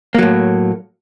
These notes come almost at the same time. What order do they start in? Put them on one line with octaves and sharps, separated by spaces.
A#3 F#3 A2